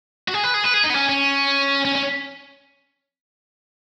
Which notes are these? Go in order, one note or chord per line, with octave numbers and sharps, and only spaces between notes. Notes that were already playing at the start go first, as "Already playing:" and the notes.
F#4
G#4
B4
G#4
B4
G#4
D#4
B3
C#4
C#4
C#4
C#4